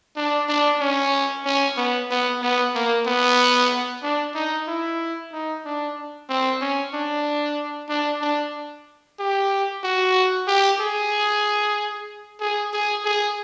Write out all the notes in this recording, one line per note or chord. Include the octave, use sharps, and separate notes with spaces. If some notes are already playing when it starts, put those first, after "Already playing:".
D4
D4
C#4
C#4
B3
B3
B3
A#3
B3
D4
D#4
E4
D#4
D4
C4
C#4
D4
D4
D4
G4
F#4
G4
G#4
G#4
G#4
G#4